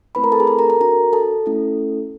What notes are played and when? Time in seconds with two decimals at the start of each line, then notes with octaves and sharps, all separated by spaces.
0.15 A3 C4 E4 B4 B5
0.24 A#4 A#5
0.32 A4 A5
0.40 G#4 G#5
0.47 A4 A5
0.59 A#4 A#5
0.70 A#4 A#5
0.80 D4 F#4 A4 A#4 A#5
1.13 A4 A5
1.46 A3 C#4 E4 A4